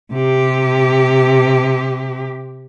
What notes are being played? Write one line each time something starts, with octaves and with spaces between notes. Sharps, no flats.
C3 G4